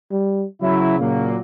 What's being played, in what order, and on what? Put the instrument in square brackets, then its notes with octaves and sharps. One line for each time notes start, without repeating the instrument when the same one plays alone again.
[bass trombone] G3
[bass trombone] C#3 [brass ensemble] F#3 E4
[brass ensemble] A#2 F#3 A#3